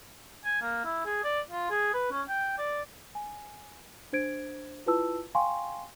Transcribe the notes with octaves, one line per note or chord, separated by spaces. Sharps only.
G#5
A#3
E4
G#4
D5
F4
G#4
B4
C#4
G5
D5
G#5
D4 C5 G#6 D7
E4 F4 B4 A5 E6
F5 G5 G#5 C6 C#6